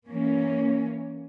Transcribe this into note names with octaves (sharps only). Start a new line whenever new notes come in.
E3 A#3 C#4